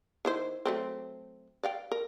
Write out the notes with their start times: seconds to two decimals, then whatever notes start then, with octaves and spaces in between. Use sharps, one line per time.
0.25 D#3 E4 C5
0.65 F#3 A3 C4
1.63 D5 F5 G5
1.92 A#4